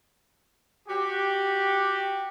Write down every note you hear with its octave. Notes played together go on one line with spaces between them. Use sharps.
F#4 G4